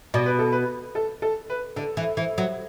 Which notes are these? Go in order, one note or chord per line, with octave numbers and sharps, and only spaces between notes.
B2 D5
B4
A4
B4
A4
A4
B4
D3 A4
E3
E3
F#3